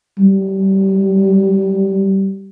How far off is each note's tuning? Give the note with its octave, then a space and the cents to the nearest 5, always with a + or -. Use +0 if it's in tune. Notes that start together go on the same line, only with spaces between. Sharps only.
G3 -25